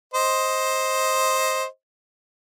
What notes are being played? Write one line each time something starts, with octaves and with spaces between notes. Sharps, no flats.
C5 D#5